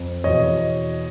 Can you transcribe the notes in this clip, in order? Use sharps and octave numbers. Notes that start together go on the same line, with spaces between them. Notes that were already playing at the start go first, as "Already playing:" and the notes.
Already playing: F2
E2 B2 C#5 D#5